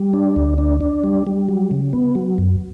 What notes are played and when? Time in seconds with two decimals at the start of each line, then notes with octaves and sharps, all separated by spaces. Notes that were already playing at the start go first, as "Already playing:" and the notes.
Already playing: G3
0.13 D4
0.36 D2
0.58 D4
0.81 D4
1.04 G3
1.27 G3
1.49 F#3
1.71 C#3
1.93 B3
2.15 F#3
2.38 F#2